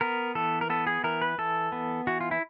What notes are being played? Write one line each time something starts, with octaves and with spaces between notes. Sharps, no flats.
B3 A#4
E3 A4
A#4
B3 A4
G#4
E3 A#4
B4
E3 A4
B3
E3 F#4
F4
E4